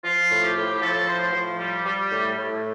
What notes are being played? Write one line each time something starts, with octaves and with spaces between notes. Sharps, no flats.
F3 F4
A2
G4
A2
F3 A4
A2 C5
F3
G3
G3
A2
A2